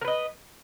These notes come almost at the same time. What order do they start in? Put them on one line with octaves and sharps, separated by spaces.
A#4 B4 D#5